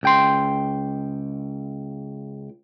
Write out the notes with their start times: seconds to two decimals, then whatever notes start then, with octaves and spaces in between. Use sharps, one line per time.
0.03 C#2 G5 C6